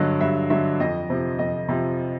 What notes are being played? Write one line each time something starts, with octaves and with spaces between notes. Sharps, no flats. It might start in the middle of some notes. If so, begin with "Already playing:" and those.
Already playing: G2 D3 F#3 D#5
G2 E5
D3 F#3 E5
F2 D#5
C3 F3
F2 D#5
C3 F3